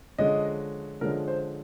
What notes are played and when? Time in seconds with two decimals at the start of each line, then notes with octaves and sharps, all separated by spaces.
0.18 D3 F3 G#3 C#4 D#5
1.01 D3 F3 G#3 C#4 A#4
1.28 C5